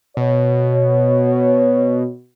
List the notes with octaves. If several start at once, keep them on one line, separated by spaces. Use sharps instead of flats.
B2 C#5